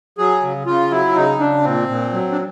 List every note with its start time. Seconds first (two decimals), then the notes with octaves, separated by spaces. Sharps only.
0.18 F#3 G#4
0.43 C#3
0.66 C#3 F4
0.91 F#3 E4
1.16 C#3 D#4
1.39 C#3 D4
1.64 A#2 C4
1.88 A#2
2.13 F#3
2.32 D4